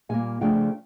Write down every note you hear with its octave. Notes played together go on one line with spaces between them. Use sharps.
A#2 G3 A#3 G#5
C#3 F3 A3 D4 F4 G5